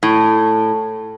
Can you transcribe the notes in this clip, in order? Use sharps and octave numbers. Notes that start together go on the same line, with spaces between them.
A2